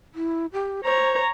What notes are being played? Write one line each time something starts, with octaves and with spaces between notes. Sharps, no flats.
E4
G4
C5 C#5 A#5